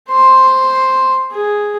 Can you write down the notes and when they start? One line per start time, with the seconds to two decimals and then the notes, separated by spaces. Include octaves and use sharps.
0.10 C5 C6
1.31 G#4